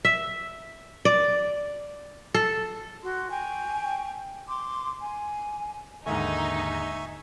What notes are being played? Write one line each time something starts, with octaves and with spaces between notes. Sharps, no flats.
E5
D5
A4
F#4 C6
G5 G#5 C#6
C6 D6
G#5
D#2 G#2 D3 D#4 E5 G#5 C#6